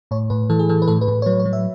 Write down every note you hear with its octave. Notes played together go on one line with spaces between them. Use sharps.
A2 C#5
A2 B4
E3 A4
G#4
E3 A4
B4
A2 A4
B4
A2
C#5
F#3 B4
C#5
F#3
E5